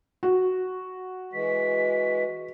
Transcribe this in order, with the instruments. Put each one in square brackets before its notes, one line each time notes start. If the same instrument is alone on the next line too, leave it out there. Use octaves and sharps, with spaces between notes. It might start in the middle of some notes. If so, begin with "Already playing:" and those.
[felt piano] F#4
[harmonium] E3 G#3 [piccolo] B6